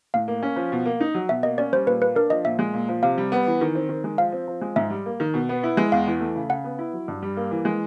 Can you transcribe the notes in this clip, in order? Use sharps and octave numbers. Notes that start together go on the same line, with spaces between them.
A2 F5
A#3
C#4
F3
B2
A#3
D#4
F#3
B2 E5
A#3 D#5
C#4 D5
G3 C5
A#2 B4
A#3 B4
D4 A#4
F3 D#5
A#2 E5
G#3
A#2
F3
C3 F5
G3
B3
E3
D#3
C4
D#3
G#3
F3 F5
C4
F3
G#3
G#2 E5
G3
A#3
D#3
B2
B3
E4
G#3
E2 F5
E3
A3
C#3
C#3 F#5
B3
E4
F#3
G2
G3
A#3
E3
G#3